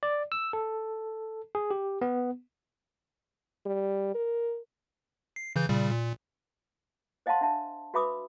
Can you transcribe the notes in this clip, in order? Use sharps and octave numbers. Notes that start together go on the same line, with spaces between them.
D5
E6
A4
G#4
G4
B3
G3
A#4
C7
C#3 E3 G6
A#2 C#3 G3
A#2
C5 D#5 F5 F#5 A5 C6
D4 E5 A5
F#4 B4 E5 B5 D6 D#6